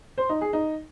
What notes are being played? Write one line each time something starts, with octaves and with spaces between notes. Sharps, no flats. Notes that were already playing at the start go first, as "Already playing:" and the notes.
C5
D#4
G#4
D#4